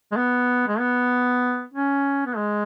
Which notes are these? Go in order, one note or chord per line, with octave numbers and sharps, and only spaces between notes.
G#3
B3
G#3
B3
C#4
B3
G#3